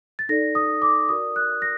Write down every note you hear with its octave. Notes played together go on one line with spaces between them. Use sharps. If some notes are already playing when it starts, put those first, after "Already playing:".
A6
D#4 A4 D5 A#6
D#6
D6
F#4 A#4 D5 D#6
F#6
A#6